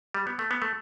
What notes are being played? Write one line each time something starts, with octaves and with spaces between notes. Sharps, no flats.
G3
B3
A3
B3
A3